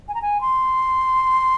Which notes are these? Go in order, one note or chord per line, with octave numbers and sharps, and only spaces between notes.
G#5
A#5
G#5
C6